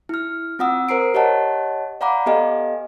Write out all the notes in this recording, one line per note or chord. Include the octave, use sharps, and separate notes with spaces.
E4 F6
C4 F4 F#5 D#6 E6
A#4 C5 A#5 C7 D7
G4 C#5 D#5 F#5 A5
D5 F5 F#5 A#5 B5 D6
B3 G4 A4 D#5 F5 G#5